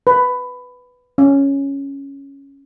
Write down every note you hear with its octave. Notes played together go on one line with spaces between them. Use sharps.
B4
C#4